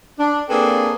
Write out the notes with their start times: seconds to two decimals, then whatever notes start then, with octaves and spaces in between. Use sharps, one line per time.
0.19 D4
0.49 A#3 C4 D4 G#4 A4 B4